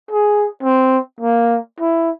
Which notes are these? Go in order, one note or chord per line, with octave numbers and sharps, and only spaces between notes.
G#4
C4
A#3
E4